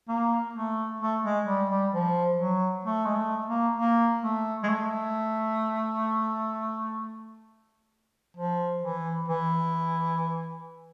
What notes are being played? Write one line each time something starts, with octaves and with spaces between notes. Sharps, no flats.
A#3
A3
A3
G#3
G3
G3
F3
F#3
A3
G#3
A3
A#3
A#3
A3
G#3
A3
F3
E3
E3